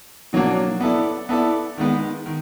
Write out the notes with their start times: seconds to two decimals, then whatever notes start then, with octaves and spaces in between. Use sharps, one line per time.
0.33 B2 F#3 A#3 D4 F#4
0.81 B3 E4 A4 D5
1.29 B3 E4 A4 D5
1.77 D#3 G#3 B3
2.26 D#3